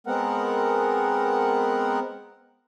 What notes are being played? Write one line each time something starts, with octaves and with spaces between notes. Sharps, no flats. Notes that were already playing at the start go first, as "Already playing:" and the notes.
G#3 B3 C4 A#4 F#5